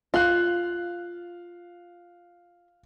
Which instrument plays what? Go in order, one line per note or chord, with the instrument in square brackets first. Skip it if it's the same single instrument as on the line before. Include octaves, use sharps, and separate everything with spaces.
[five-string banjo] F4 [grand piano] F5 F#6